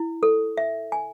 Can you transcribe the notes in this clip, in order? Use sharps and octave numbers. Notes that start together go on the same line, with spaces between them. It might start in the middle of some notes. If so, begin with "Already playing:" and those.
Already playing: E4
A4
E5
G#5